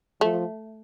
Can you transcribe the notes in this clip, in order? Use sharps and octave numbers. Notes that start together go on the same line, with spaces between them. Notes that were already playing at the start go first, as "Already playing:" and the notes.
F3 A3